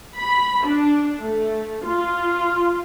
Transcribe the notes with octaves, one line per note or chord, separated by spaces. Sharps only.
B5
D4
A3
F4